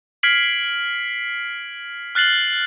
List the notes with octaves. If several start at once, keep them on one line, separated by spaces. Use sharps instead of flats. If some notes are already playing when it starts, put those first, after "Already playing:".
F6 G#6 B6 C7 D7 F#7
F6 F#6 A6 C7 F#7 G7